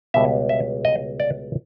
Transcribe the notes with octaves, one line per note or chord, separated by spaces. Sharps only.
C#2 B2 G3 B3 E5
E5
D#5
D5